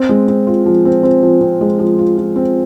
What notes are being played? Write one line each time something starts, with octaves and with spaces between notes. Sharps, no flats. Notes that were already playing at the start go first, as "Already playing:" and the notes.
Already playing: C4
G#3
C4
F4
F3
C4
C4
F3
C4
G#3
F3
F4
F3
C4